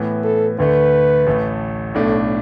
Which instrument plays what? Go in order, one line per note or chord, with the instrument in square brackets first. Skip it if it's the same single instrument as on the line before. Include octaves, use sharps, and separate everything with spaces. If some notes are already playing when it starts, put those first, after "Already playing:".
Already playing: [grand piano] A2 E3 B3
[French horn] A4
[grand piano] D2 D3 A3 [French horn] B4
[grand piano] A1 A2 A3
[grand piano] B1 A2 A3 D4 [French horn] A4